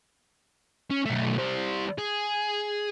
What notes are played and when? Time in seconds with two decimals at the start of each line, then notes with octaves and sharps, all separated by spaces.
0.90 C#4
1.06 B1 A3
1.38 G3 C5
1.98 G#4